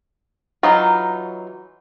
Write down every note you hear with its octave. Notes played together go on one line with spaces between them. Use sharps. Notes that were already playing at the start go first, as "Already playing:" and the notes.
E3 F#3 D#4 F4